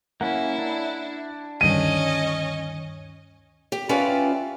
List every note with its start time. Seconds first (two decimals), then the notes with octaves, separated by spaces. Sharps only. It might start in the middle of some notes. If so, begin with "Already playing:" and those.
0.21 A#3 C#4 E4 F#5
0.58 D4
1.61 D2 G2 D#3 C#4 D#5 D#7
3.72 G4
3.89 C#4 E4 F4 G4 B4 D5